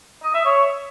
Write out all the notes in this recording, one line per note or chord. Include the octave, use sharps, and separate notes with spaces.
D#5
E5
C#5